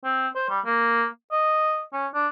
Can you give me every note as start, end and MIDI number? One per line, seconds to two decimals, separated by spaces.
0.04 0.28 60
0.35 0.45 72
0.49 0.60 55
0.65 1.05 58
1.32 1.84 75
1.93 2.07 61
2.14 2.28 62